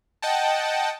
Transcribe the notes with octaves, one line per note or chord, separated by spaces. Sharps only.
D#5 F#5 G5 A5